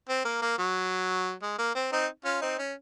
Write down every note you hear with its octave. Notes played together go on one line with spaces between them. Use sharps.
C4
A#3
A#3
F#3
G#3
A#3
C4
C4 D#4
C#4 F4
C4 D#4
C#4